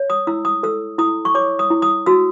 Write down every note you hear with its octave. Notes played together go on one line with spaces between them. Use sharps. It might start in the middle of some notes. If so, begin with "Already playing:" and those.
Already playing: C#5
D#6
E4 E6
D#6
A4 E6
E4 D#6
C#6
C#5 D6
D#6
E4
D#6
F#4 E6